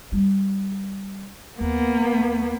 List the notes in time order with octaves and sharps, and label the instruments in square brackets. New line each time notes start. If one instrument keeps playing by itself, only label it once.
[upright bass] G3 D#4
[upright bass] D#2 [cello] A#3 B3